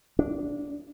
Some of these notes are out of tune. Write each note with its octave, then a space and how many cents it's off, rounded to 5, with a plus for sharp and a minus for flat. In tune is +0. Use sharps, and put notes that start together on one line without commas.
D4 -15